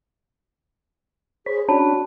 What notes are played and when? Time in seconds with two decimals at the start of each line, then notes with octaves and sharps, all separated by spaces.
1.46 G#4 C5 C#5 B5
1.68 C#4 D4 F#4 C#5 A5 B5